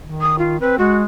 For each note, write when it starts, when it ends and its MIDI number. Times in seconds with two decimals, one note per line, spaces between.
0.02 0.57 51
0.21 0.36 87
0.39 0.57 65
0.61 0.76 60
0.61 0.75 71
0.78 1.05 56
0.78 0.97 66